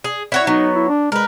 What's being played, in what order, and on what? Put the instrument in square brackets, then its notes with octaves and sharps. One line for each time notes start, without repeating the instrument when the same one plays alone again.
[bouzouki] G#4
E4 F#4 C#5
[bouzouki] F#3 B3 [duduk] D#4
[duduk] E4
D4
[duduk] G#3 [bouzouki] A#4 B4